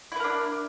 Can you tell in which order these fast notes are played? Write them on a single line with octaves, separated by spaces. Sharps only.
E4 B4 A#4 D4